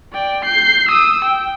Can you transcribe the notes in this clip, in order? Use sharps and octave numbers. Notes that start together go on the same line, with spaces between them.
D5 G5
G6 C7
D#6 E6
G5